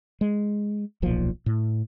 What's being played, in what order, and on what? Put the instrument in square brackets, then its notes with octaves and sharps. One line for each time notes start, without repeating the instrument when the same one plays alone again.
[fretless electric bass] G#3
D1 B1 A#2 F3
A2